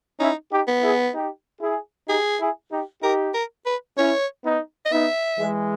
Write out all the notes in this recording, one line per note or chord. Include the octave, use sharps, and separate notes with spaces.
C#4 D#4 E4
D#4 G4
B3
E4 G#4
D#4 G4
E4 G#4
D#4 G4 G#4
E4 G#4
D#4 G4
D#4 G4 A#4
A#4
B4
C#4 E4 C#5
B3 D#4
D#5
B3 D#4 E5
E3 G#3